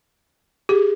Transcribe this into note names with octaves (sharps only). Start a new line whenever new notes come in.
G4 G#4